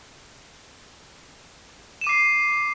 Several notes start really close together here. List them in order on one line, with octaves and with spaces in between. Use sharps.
E7 D#7 D6 C7